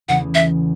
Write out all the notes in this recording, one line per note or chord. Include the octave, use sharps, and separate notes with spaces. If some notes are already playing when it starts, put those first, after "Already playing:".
E2 C#3 E3 A3 C#4 F#5
E5